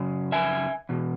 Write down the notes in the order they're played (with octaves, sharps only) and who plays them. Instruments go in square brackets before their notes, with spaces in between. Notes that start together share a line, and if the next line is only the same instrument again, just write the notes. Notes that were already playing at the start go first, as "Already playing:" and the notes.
Already playing: [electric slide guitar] F#2 C#3
E5 G#5
E2 B2